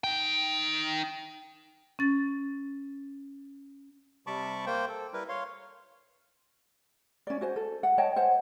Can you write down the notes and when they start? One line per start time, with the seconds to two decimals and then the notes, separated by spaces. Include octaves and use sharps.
0.04 D#4 G5
1.99 C#4 A6
4.27 C3 G3 A5 B5 C#6 D6
4.66 A#3 C5 G5
4.89 A4
5.13 G3 E4 A#4 B4
5.29 C#5 F5 C6
7.27 C#4 D5
7.41 F#4 C5 G#5
7.56 A4
7.83 F#5
7.98 C#5 D#5 G5 A5
8.16 C5 F#5 G#5